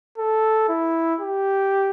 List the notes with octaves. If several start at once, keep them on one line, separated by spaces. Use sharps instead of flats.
A4
E4
G4